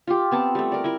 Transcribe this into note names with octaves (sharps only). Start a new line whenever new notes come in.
F4 G4
B3 C4 A5
G3 A3
A#4 D5
E4 A#4